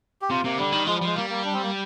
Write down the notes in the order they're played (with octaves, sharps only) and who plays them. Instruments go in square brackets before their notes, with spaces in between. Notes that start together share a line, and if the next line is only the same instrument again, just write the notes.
[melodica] G4
[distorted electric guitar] C3 [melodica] F4
[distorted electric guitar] C3 [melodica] A#3
[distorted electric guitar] D3 [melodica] G3
[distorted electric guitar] D#3
[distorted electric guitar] F3 [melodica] G#3
[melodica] G3
[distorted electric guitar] F3 [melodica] G#3
[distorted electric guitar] G3 [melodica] A#3
[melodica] A#3
D4
C4
A#3